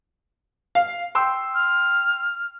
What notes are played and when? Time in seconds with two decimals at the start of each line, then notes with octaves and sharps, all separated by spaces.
0.75 F5
1.15 G5 C6 E6
1.54 F6